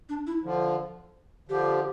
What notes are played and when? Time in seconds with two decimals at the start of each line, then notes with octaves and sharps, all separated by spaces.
0.09 D4
0.27 E4
0.44 D3 F3
1.49 D3 F3 G4